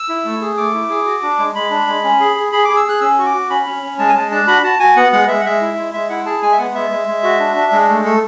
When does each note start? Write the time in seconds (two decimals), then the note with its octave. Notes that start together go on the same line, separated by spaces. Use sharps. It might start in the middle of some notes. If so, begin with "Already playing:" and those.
Already playing: E6
0.09 E4
0.25 A3
0.41 G#4
0.57 A3 D6
0.74 E4
0.90 G#4
1.06 F#4
1.22 D4
1.39 G#3
1.55 G#3 B5
1.71 D4
1.87 G#3
2.04 C#4
2.20 G#4
2.36 G#4
2.52 G#4 B5
2.65 G#4 D6
2.77 E6
2.85 G#4 F#6
3.01 C#4 E6
3.18 F#4 C#6
3.26 D6
3.34 F#4
3.50 C#4 B5
3.66 C#4
3.82 C#4
3.99 G#3 A5
4.09 G#5
4.15 G#3 A5
4.31 D4 A5
4.47 F#4 B5
4.63 F#4 A5
4.79 F#4 G#5
4.96 B3 F#5
5.12 G#3 F#5
5.28 G#3 E5
5.40 F#5
5.45 G#3 E5
5.61 E4
5.77 G#3
5.93 G#3 E5
6.09 E4 F#5
6.26 G#4 A5
6.42 G#3 G#5
6.52 E5
6.58 B3 F#5
6.75 G#3 E5
6.91 G#3
7.08 G#3
7.23 F#4
7.40 D4
7.56 D4
7.72 G#3
7.89 A3
8.04 A3 A4